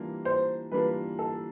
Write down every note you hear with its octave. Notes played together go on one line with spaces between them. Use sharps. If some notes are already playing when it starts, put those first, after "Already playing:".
Already playing: E3 G3 A#3 D4 F4
C5
E3 G3 A#3 D4 F4 B4
A4